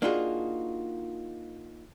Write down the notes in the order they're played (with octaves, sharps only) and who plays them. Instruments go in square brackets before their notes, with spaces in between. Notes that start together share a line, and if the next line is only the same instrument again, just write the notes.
[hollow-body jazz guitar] A#3 D4 D#4 F4 F#4 G#4